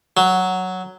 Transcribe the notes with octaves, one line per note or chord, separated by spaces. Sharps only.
F#3